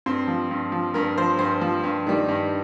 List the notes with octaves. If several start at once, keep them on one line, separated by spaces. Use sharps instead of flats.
G2 C4
F3
G2
F3
G2 A#4
F3 C5
G2 C5
F3
G2
D#3 G3
G2